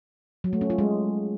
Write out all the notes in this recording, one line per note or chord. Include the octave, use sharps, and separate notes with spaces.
F#3
A3
C#4
F4
G#3